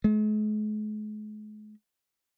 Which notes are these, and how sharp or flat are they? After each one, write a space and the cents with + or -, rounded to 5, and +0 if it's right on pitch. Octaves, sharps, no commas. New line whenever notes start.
G#3 +45